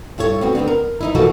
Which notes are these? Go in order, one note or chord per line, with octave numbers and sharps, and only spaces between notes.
G2 E4 A4 C#5
B3 C4 F#4
D3 B3 C4 D4
A#4
E3 D#4 E4
B2 E3 F3 A#3 F#4 A4